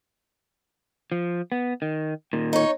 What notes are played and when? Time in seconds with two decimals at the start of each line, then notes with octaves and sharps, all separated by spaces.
1.12 F3
1.52 B3
1.82 D#3
2.33 A#2 D#3
2.53 D#4 C#5